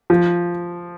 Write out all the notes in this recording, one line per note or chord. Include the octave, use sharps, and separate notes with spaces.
F3